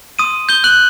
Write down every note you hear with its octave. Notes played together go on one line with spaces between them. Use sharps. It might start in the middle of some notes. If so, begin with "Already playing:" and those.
C6 D#6 D#7
D#6 G6 G7
F#6 F#7